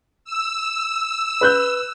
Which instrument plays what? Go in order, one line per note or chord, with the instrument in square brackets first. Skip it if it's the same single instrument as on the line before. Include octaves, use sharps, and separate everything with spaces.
[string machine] E6
[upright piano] B4 F#6 G6